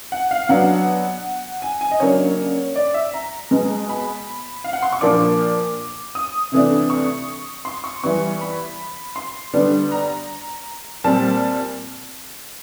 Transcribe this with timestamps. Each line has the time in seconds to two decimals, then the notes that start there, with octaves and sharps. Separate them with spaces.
0.12 F#5
0.31 F5
0.49 B2 F#3 B3 D4 F#5
1.62 G#5
1.81 G#5
1.91 D#5
2.00 C#3 F#3 A#3 D4 C#5
2.76 D5
2.94 E5
3.14 A#5
3.51 B2 G#3 B3
3.89 B5
4.64 F5
4.73 F#5
4.83 C6
4.92 C#6
5.01 A#2 F3 A#3 D4 D6
6.15 D#6
6.52 C3 E3 A3 D4
6.90 C#6
7.65 C6
7.84 C#6
8.03 E3 G3 B3 C#6
8.41 B5
9.16 C6
9.54 D3 G3 B3 D4
9.92 A#5
11.04 A#2 G3 C4 A5